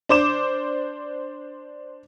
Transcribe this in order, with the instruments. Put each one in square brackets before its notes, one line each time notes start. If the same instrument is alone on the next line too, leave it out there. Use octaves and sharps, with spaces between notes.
[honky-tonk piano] D4 C5 D6 E7